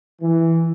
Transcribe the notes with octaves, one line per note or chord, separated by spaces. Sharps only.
E3